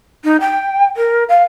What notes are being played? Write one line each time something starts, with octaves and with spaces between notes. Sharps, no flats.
D#4
G5
A#4
F5